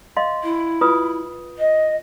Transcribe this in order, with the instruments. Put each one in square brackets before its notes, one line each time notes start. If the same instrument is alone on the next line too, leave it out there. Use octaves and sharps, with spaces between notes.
[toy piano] D#5 F5 C6
[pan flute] E4
[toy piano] F4 B4 D#6
[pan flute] D#5